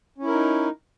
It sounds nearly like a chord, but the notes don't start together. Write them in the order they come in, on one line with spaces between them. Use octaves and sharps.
C#4 E4 A#4 D#4